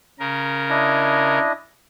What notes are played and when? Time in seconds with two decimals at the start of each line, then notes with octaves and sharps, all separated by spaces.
0.19 C#3 A#4
0.70 D4 E4 D#5